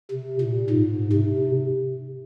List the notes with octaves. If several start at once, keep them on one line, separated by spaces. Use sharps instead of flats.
C3
A#2
G#2
C3